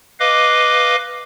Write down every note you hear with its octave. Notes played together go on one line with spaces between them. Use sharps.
B4 D#5 F5 D6